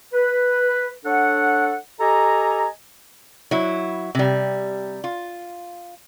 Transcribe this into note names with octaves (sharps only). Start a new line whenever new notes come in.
B4
D4 A4 C#5 F#5
G4 A4 D#5 G#5 A#5
F#3 E4
C3 G3
F4